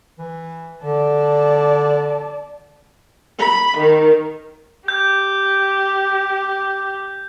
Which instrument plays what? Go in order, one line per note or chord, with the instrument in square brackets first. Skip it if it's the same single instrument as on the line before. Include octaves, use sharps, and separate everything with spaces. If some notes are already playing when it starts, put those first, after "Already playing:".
[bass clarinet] E3
[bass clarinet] D3 [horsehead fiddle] D5 A5
[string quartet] B5
D#3
[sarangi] G4 [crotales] G6